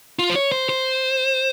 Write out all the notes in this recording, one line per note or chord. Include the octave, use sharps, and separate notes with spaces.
F4
C5
C#5
C5
C5